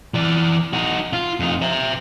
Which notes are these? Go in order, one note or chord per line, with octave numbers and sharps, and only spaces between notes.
E3 D5
D#4 F#4
F4
F2 D#4
C5 E5